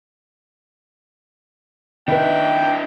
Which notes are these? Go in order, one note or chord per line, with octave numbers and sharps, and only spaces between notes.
D#3 D4 E4 B4 G5